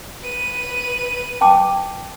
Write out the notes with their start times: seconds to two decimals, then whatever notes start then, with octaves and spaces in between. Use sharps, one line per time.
0.23 B4 D#7
1.41 G5 A5 D6